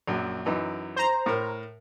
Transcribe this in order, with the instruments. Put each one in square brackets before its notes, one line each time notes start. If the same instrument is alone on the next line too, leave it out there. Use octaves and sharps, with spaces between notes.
[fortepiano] A#1 F#2
F#2 E3 D#4
[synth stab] C5 A#5
[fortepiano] A2 A#4